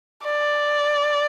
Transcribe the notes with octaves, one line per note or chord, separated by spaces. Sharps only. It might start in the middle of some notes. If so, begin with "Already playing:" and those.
D5